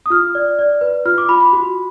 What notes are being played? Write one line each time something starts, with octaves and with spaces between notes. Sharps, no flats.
D#6
F4 F6
D5
D5
B4
F4 F6
D6
F4 B5
B5
F#4